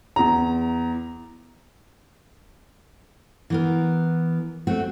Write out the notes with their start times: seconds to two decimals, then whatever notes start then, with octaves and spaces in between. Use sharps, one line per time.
0.16 E2 A#5
3.50 E3 B3 A#4
4.67 A3 C4 F#4